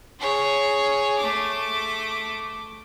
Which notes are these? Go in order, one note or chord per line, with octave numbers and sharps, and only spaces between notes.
G#4 C#5
A3 D6